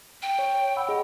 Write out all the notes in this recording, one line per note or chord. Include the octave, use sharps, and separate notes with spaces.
G5
C#5
F#5 B5 E6
G#4 D#5 F#5